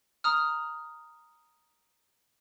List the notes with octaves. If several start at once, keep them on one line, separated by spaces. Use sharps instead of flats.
A#5 D#6 F6